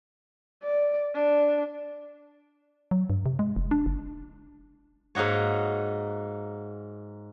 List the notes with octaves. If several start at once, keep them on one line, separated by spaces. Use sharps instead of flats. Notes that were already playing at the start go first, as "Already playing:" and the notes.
D5
D4
F#3
G2
C3
G#3
F1
D4
F#1
G#2 A#3 D#4 F#4 C#5